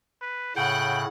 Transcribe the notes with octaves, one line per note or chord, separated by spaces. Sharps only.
B4
A2 C#3 F#5 G5 F#6